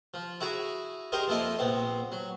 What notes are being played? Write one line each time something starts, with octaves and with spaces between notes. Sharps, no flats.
F3
E4 F#4 G#4 A#5
G4 G#4 A#4 C5 D#5
F2 F3 A#3 E4 D#5 D#6
A#1 B3 C4
F#3